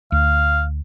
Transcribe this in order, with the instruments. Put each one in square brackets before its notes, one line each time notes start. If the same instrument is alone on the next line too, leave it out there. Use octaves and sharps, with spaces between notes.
[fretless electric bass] D2 [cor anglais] F5